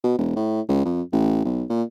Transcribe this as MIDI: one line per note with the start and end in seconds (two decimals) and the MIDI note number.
0.04 0.13 47
0.18 0.32 28
0.36 0.61 45
0.69 0.83 37
0.85 1.02 41
1.13 1.42 33
1.45 1.64 35
1.70 1.83 46